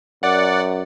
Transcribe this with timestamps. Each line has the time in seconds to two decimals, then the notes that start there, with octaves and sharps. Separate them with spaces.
0.23 F#2 D5 F#5